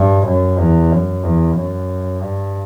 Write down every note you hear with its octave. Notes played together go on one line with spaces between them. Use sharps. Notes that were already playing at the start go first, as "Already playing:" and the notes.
Already playing: G2
F#2
E2
F#2
E2
F#2
G2